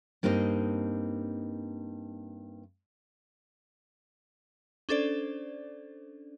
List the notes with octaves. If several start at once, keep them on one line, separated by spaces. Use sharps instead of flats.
G2 A#3 C4 D#4 B4 D#5
C#4 D4 A4 C5 D5